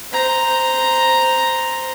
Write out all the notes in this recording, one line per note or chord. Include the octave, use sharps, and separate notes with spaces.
C5 A#5